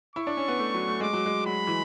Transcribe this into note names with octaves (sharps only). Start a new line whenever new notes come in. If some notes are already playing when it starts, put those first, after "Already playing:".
E4 C#6
D4
C#4
B3
A3
F#3
A3
G#3 D6
F#3
G#3
F#3 B5
E3